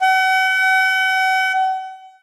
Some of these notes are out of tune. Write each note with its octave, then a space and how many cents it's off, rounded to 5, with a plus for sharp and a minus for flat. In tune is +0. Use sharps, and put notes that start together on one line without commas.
F#5 +40